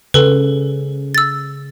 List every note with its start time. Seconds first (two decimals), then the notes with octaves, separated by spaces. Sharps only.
0.14 C#3 A4 B4
1.15 E6 A6